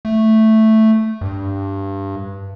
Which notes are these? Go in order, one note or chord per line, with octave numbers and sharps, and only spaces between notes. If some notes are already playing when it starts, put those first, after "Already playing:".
A3
G2